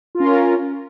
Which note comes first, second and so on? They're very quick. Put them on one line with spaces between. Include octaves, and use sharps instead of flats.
F4 A#4 C#4